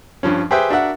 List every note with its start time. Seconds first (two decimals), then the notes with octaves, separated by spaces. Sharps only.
0.23 G2 F3 C#4
0.51 G4 G#4 B4 C5 E5 G5
0.70 D4 F#4 A#4 E5 F#5